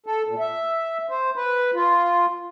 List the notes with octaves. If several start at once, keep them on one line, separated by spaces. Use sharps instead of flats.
A4
A#2
E5
C5
B4
F4